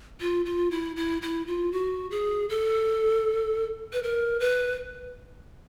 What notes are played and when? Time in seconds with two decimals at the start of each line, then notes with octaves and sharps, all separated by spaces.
0.20 F4
0.46 F4
0.71 E4
0.96 E4
1.22 E4
1.47 F4
1.72 F#4
2.11 G#4
2.49 A4
3.93 B4
4.03 A#4
4.40 B4